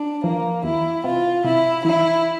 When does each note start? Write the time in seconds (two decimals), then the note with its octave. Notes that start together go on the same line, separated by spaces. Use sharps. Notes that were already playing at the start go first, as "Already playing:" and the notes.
Already playing: D4
0.23 F3 A#3
0.64 E2 E4
1.04 C3 F4
1.44 C3 E4
1.84 E3 E4